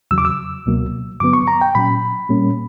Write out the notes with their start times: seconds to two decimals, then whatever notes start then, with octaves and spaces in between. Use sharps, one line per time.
0.11 E2 C#3 F#3 E6
0.18 D6
0.25 E6
0.66 C#2 B2 F#3 A#3
1.20 G2 D3 F#3 B3 D6
1.33 C#6
1.48 A#5
1.61 G5
1.75 A#2 F#3 C#4 B5
2.29 A#2 G3 A#3 C#4